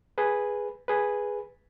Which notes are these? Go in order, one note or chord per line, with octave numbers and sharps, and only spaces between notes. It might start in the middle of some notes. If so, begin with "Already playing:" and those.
G#4 B4
G#4 B4